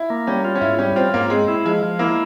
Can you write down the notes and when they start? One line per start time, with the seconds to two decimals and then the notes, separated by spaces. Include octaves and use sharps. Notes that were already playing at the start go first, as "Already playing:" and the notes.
Already playing: E4
0.10 A#3
0.27 G3 C#4
0.45 F4
0.55 C#4
0.61 G#2 E4
0.79 G3 C#4
0.96 C4 F4
1.14 G#2 A#3
1.30 G#3 C4
1.48 E4
1.65 F3 G#3
1.83 F3
1.99 A#3 E4